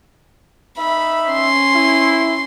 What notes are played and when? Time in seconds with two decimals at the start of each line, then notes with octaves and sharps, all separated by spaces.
0.77 D#4 E5 B5
1.30 C#4 C6
1.74 E4